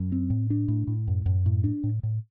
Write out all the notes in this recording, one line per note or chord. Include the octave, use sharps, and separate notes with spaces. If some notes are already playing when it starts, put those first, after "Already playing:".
Already playing: F#2
C4
A2
D4
A2
A2
F#2
F#2
A2
D4
A2
A2